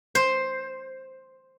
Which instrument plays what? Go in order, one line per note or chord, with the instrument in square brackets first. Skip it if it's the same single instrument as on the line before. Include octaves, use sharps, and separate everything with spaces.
[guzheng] C5